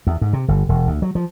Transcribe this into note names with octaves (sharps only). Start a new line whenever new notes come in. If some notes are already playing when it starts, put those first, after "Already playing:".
E2
G#2
C3
G1
E1
D2
F#3
F3